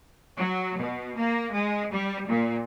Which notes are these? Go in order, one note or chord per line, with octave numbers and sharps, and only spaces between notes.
F#3
B2
A#3
G#3
G3
A#2